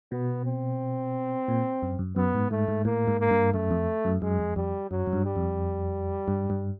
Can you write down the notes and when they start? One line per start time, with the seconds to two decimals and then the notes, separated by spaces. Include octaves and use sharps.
0.12 B2 B3
0.46 C4
1.48 A#2
1.83 F#2
1.99 F#2
2.16 F#2 B3
2.34 G#2
2.51 G#2 A3
2.68 G#2
2.85 A2 A#3
3.08 G#2
3.19 A#3
3.31 G2
3.53 F#2 A3
3.71 F2
4.05 F#2
4.22 F#2 G#3
4.39 F2
4.56 F2 G3
4.90 F#2 F#3
5.07 F#2
5.13 G2
5.25 G3
5.36 F2
6.28 G2
6.50 G2